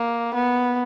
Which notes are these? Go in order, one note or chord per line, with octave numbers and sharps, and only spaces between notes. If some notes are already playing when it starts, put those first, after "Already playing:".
Already playing: A#3
B3